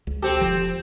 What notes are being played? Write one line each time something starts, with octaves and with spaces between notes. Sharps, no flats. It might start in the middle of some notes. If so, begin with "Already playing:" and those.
C#2
C4 G4 A4
E1 F3